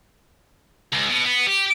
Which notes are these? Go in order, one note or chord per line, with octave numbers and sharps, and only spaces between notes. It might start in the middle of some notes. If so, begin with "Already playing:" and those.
C#2
B2
B3
G4